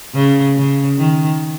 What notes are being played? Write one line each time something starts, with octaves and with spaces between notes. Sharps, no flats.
C#3
C#3
D#3